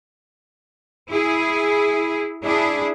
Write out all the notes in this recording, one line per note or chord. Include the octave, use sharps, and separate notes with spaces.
E4 G#4
D4 E4 G#4